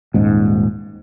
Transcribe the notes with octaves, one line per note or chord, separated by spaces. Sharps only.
D#1 G#2